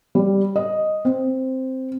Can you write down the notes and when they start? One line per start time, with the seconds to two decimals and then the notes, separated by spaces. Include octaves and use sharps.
0.15 G3
0.56 D#5
1.05 C4